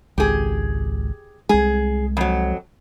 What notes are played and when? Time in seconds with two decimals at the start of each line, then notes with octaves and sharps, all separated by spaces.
0.18 G#1 C#2 G4 G#4
1.49 C2 G#3 G#4
2.17 F2 F#3